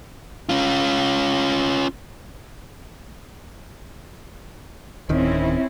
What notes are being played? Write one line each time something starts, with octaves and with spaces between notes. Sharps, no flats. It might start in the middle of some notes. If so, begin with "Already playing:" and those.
C#4 F4
D1 D#3 C4 C#4 E4